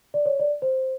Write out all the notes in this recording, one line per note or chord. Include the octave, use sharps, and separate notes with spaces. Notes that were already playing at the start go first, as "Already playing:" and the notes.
D5
C#5
D5
C5